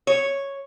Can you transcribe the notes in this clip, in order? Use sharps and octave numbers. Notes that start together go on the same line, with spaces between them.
C#5